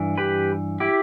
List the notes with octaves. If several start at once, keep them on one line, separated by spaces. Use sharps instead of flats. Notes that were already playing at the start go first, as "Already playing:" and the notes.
Already playing: G2 E3
G4 B4
E4 G4